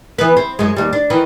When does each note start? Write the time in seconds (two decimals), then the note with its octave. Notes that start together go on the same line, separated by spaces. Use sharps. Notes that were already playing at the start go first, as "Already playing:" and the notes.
0.18 E3 B3 B4
0.37 C4
0.59 F#2 G#3
0.76 D#2 G3
0.93 D4
1.10 D#3 E3